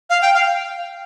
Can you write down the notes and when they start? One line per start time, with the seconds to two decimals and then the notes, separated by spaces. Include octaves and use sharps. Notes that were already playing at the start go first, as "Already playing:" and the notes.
0.10 F5
0.22 G5
0.34 F5